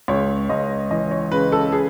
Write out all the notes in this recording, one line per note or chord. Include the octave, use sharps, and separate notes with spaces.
C#2 C#5
C#2 D#5
E3 D#5
C#5
C#3 B4
A4
G#4